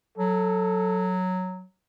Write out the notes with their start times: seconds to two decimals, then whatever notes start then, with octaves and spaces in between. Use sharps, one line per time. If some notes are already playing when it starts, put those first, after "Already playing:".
0.18 F#3 A4